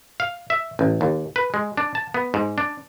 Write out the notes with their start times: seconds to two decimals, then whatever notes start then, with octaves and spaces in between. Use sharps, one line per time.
0.20 F5
0.50 E5
0.79 A1
1.01 D#2
1.36 B4
1.54 G#3
1.77 D4
1.95 A5
2.14 B3
2.34 G#2
2.58 D4